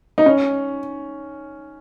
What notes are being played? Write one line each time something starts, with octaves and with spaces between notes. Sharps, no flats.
D#4
C#4